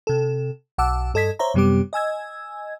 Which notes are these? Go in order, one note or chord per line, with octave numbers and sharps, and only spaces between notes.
C3 A4
B1 F#5 A5 D6 E6
G2 A4 D#5 G#6 B6
C5 C#5 E5 A#5
F#2 C3 G3 B3 G4 D6
D#5 G#5 E6 G#6